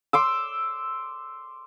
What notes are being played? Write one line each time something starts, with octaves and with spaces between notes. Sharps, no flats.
C6 D6 E6